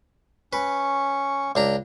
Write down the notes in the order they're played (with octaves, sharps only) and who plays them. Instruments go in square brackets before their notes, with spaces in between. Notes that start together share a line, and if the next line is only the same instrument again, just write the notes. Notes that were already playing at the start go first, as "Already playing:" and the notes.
[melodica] C#4 C#6 [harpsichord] B4
[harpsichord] C#2 D4 A#5